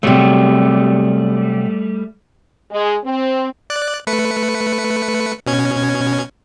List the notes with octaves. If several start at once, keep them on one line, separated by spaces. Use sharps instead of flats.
C3 F#3 G3 A3
G#3
C4
D5 F#6
A3 B4 C#7
B2 C#4 G#6